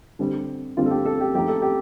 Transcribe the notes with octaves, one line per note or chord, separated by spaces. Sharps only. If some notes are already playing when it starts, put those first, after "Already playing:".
D3 G3 C4
D3 G3 C4 F4
A4
G4
A4
G4
F3 A3 D#4 G4
A4
G4